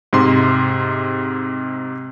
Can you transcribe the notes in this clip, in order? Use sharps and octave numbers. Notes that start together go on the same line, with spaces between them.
G#2 C3 C6